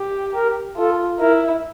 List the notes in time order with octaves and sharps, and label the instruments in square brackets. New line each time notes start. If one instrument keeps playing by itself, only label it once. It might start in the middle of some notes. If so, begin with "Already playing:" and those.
Already playing: [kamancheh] G4
[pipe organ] A#4
[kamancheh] F4 [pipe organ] A4
[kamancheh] E4 [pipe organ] A#4